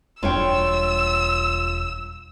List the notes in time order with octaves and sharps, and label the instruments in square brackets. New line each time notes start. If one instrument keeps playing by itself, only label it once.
[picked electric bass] E1 G3 D4 [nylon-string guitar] F4 C#5 G5 [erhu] E6